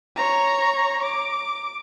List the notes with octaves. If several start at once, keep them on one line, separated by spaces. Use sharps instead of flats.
C#5 A#5
D6